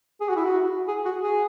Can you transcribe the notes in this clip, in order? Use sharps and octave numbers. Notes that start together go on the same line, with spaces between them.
G#4
F#4
E4
F#4
G#4
F#4
G#4